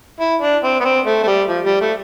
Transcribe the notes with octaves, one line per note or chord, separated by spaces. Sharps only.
E4
D4
C4
B3
C4
A3
A3
G3
F3
G3
A3